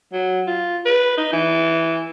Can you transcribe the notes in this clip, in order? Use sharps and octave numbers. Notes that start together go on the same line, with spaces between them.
F#3
F4
B4
D#4
E3